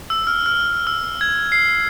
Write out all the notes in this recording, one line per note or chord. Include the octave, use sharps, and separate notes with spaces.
E6
F6
F6
E6
G#6
C7